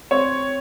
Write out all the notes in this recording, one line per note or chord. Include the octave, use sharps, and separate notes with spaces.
C4 C#5